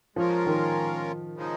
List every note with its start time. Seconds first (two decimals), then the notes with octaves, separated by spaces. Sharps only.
0.16 F3 G#3 C#4 F4 A#4
0.46 D#3
1.36 C#3 F3 G#3 D#4